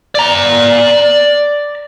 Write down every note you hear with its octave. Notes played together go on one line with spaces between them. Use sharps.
D5 A#5